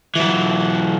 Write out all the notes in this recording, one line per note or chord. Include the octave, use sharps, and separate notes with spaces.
E3 F#3